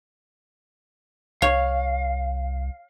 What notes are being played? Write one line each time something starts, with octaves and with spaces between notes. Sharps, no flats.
C2 C#5 F5